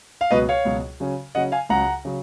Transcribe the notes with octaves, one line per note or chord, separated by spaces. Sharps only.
F5
C#2 B2 F#3 B4 D#5
C#5 F5
C#2 B2 F#3
C#3 F#3 C#4
C#3 F#3 C#4 D#5 F#5
F5 G#5
C#2 C#3 F#3 F#5 A#5
C#3 F#3